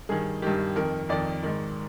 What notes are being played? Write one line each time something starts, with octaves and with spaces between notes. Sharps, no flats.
G2 D#3 G#4
G2 D#3 G4
F2 D#3 A#4
F2 D#3 D5
G#2 D#3